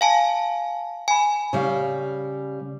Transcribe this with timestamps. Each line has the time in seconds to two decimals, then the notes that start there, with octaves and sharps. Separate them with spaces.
0.01 F5 G#5 A5
1.08 G#5 B5
1.53 C#3 G3 F5